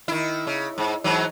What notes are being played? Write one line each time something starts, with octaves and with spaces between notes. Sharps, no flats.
D#3 E4
C#3
G#2
G#2 E3 F#3